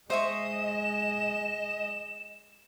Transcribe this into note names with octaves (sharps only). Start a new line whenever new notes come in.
G#3 C5 D#5 E5 C#6 E7